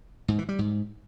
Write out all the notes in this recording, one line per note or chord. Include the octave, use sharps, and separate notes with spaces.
G#2
E3
G3
G#2